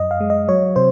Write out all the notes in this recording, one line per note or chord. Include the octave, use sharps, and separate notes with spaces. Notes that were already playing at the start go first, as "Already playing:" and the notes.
Already playing: F#2 D#5
F5
G#3
D#5
F#3 C#5
C3 C5